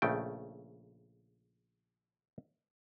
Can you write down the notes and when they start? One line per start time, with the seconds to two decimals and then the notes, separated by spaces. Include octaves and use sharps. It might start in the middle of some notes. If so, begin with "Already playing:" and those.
0.02 A#1 C#3 A3 G5